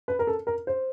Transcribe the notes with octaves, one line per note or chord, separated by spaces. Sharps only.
B4
A#4
A4
A#4
C5